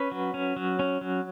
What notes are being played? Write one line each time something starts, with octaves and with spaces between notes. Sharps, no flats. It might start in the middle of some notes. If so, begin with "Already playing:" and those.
Already playing: C#4 B4
F#3
C#4
F#3
C#4
F#3